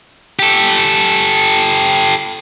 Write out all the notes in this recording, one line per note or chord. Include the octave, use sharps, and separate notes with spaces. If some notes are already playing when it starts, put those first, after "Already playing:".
G4 A4